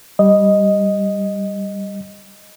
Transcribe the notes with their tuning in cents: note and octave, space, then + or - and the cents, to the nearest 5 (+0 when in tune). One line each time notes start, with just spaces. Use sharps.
G3 +0 D#5 +0